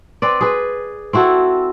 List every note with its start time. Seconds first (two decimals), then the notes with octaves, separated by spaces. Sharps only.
0.22 C4 B4 D5
0.41 G#4 B4
1.13 C4 E4 F#4 A4